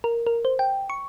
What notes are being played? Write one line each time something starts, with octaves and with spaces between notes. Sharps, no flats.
A#4
A#4
C5
G5
C#6